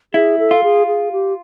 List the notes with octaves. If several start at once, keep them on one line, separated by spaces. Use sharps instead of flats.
E4 G#4
A4
F4
G#4
G#4
G4